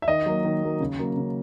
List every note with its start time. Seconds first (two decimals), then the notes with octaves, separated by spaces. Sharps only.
0.02 E5
0.08 D#3 D#5
0.26 F#3 A#3
0.45 D#3
0.63 F#3 A#3
0.80 C#3
0.99 F#3 A#3
1.17 C#3